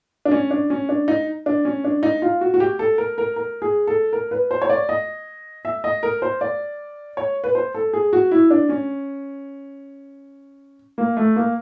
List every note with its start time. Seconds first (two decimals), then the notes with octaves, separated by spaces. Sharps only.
0.25 D4
0.31 C#4
0.51 D4
0.70 C#4
0.89 D4
1.08 D#4
1.46 D4
1.65 C#4
1.84 D4
2.03 D#4
2.22 F4
2.41 F#4
2.54 F#4
2.60 G4
2.79 A4
2.98 A#4
3.18 A#4
3.36 A#4
3.62 G#4
3.87 A4
4.13 A#4
4.31 B4
4.51 C5
4.62 C#5
4.70 D5
4.89 D#5
5.65 E5
5.84 D#5
6.03 A#4
6.22 C5
6.41 D5
7.17 C#5
7.44 B4
7.55 C5
7.74 A4
7.93 G#4
8.13 F#4
8.32 E4
8.51 D4
8.69 C#4
10.98 A#3
11.17 A3
11.36 A#3